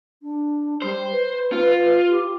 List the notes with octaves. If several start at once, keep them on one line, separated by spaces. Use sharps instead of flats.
D4
G3 C5
B4
F4
G4